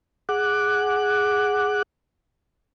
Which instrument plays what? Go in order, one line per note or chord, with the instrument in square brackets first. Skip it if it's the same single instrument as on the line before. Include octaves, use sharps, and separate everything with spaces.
[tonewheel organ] G#4 F#5 D6 F#6